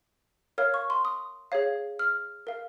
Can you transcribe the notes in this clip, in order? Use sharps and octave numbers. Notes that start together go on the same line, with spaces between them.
A#4 C#5 F5 F6
C#6
C6
D#6
G#4 C#5 F5
F6
A#4 F5